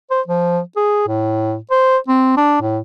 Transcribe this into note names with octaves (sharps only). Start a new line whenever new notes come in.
C5
F3
G#4
A2
C5
C4
D4
A2